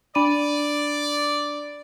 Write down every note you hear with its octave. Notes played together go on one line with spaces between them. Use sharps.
D4 D5 B5 D#7